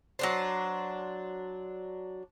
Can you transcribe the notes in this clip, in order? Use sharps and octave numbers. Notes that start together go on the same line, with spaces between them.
F#3 D4 C5